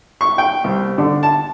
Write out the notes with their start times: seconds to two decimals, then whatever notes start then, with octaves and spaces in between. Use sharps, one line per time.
0.21 C#6
0.38 G5
0.64 C2
0.98 D3
1.23 A5